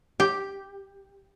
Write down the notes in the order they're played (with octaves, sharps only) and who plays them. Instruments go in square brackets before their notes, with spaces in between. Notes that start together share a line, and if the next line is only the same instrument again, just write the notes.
[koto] G4